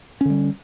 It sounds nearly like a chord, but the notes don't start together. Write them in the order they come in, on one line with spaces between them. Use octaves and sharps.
C#4 D3 G3